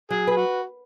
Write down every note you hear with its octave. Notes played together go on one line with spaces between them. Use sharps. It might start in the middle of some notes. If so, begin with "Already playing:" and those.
F#3 G#4
G#4 B4
F#4